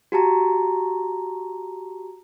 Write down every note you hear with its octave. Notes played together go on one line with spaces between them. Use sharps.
F#4 G4 A5 A#5